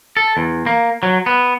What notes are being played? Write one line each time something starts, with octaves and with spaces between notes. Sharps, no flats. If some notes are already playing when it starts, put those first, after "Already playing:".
A4
E2
A#3
F#3
B3